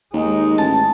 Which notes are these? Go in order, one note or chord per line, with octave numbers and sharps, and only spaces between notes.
D#2 G#3 D#4
A1 A5